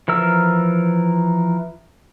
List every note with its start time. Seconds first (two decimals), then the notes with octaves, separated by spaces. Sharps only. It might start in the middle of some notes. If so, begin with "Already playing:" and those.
0.08 E3 F3 A#4 E6